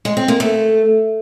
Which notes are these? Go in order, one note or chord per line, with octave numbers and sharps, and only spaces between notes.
G#3
C4
A#3
A3